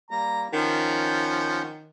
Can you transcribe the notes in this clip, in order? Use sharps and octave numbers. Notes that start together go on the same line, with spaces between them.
G3 A#3 A#5
D#3 F3 C#4 F#5 G6